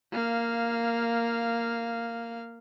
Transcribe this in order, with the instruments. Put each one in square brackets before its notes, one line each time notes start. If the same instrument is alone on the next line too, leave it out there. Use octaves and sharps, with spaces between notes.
[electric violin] A#3 F5